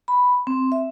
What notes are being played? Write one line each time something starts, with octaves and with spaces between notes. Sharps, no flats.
B5
C4
E5